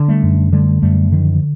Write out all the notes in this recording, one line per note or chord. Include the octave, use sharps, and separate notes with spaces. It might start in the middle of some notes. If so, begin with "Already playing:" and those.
Already playing: D3
G3 A3
F#2
D3 G3 A3
F#2 G3 A3
D3 D#3 F3